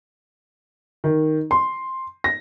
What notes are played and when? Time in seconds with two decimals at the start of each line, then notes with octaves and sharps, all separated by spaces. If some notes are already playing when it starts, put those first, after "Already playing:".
1.04 D#3
1.51 C6
2.24 A#6